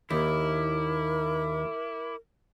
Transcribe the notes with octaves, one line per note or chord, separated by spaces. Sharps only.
D#2 E4 A#4 D6